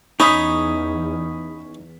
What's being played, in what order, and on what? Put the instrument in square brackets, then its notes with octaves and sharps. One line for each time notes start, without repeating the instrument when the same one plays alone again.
[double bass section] E2 [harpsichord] C#4 [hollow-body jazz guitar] D#4 [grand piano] B5 D#6 B6